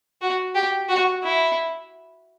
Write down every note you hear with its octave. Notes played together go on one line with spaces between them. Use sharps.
F#4
G4
F#4
E4